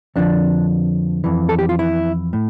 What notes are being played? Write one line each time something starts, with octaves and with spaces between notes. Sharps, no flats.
F2 D3 F3 D4
F2 E3
A4
G4
F4
E4
A2